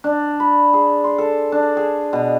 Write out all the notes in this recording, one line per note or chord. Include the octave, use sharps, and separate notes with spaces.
D4
B5
G#4
C6
A4
D4
G#4
B2